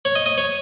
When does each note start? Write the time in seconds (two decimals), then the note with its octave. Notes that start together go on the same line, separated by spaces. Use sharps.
0.05 C#5
0.15 D#5
0.26 D#5
0.38 C#5